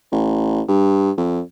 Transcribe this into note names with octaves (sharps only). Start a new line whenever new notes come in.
A1
G2
F2